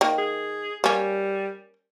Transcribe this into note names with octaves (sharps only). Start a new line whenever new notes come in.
D#3 A#3
G#4
G3 A#3 C#4